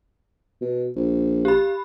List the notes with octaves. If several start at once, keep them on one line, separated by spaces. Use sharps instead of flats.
B2
A#1
G4 B5